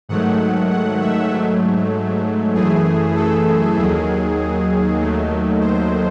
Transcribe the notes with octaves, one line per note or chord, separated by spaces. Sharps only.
G#2 D#3 F#3 A3 F#5
F#5
E5
G#2 F#3 A3
F#2 E3 A3 G#4
A4
D#2 D#3 F#3 G#4
D#2 D#3 F#3 A3
C5